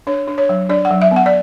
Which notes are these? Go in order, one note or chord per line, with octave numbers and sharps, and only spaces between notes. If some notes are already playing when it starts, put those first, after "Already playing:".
D4 C#5
D4
C#5
F#3
D4 D5
F#5
F#3
E5
B3
F#5
D5